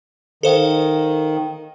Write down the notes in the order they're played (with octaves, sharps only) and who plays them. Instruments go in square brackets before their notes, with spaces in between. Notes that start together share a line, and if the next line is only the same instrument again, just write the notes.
[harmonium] D#3 [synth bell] A4 C5 F5